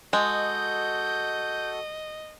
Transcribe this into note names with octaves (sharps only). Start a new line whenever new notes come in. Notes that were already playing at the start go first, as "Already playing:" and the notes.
G#3 F#4 A4 D#5 G6